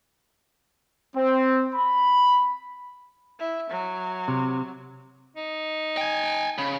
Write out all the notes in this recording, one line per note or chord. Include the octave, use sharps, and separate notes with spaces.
C4
B5
E4
F#3
C3
D#4
G5 G#5
C#3 B5